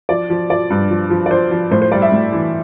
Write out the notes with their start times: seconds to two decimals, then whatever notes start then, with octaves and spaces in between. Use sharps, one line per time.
0.09 F3 D5
0.30 F3
0.50 F3 D5
0.70 G2
0.90 F3
1.10 F3
1.26 D5
1.31 F3 C5
1.51 F3
1.71 A2 C5
1.82 C5
1.92 G3 D5
2.02 E5
2.12 A2
2.32 E3